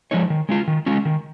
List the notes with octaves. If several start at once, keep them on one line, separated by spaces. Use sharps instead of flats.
F3 G#3 D#4 C#5
D#3
G#3 C#4 F4
D#3
G#3 C#4 F4
D#3